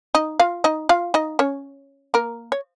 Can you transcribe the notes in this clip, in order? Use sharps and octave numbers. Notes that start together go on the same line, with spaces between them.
D#4 D#5
F4 F5
D#4 D#5
F4 F5
D#4 D#5
C#4 C#5
A#3 A#4
C#5